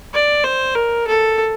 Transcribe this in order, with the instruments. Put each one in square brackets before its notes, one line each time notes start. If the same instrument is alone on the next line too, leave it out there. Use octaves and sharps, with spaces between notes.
[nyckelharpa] D5
C5
A#4
A4